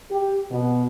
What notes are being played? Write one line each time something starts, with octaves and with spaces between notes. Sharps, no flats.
G4
B2